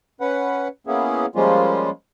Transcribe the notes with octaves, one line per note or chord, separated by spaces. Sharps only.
C#4 B4 F#5
A#3 B3 C#4 E4 G#4
F3 G3 G#3 A#3 C#4 F4